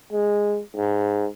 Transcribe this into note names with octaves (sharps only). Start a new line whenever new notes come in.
G#3
G#2